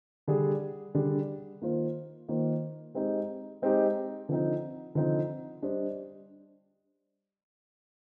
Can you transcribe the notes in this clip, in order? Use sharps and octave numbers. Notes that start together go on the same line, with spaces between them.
D3 G3 D4 G#4
D3 G3 D4 G#4
D#3 A#3 F4 C5
D#3 A#3 F4 C5
G#3 C4 D#4 G4
G#3 C4 D#4 G4
D3 F3 C4 D#4
D3 F3 C4 D#4
G3 D4 G4 C5 D#5